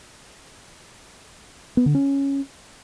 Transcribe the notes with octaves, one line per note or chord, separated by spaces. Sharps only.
B3
D3
C#4